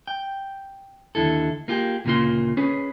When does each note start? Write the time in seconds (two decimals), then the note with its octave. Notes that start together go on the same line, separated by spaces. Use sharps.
0.07 G5
1.15 D#2 G#2 D3 E4 A4
1.68 A#3 F4 G4 G#4
2.05 D2 A#2 C#3 A#3 F4 C6
2.57 C#4 G#4 B4